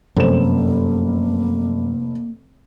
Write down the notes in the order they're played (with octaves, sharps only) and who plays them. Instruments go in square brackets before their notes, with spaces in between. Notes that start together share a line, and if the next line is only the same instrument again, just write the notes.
[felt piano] F1 C5 E7 [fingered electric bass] F#2 [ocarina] A#3